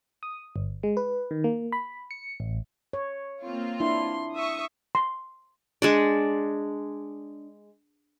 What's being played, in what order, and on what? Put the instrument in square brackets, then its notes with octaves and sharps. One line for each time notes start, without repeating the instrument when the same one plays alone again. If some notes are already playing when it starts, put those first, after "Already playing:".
[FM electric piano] D#6
G1
G#3
B4
D#3
A#3
B5
C#7
A1
[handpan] C#5
[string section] A#3 C4 F4
[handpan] D4 E4 [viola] C6
[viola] E5 [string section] C#6 D#6
[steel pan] C6
[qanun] G#3 D4 D5